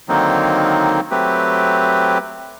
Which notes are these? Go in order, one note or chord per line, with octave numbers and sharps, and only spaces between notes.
D3 D#3 F#3 A#3 C4 D#4
F#3 A3 C4 G4 B4